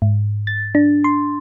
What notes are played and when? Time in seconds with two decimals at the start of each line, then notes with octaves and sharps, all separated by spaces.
0.02 G#2
0.47 A6
0.75 D4
1.04 C6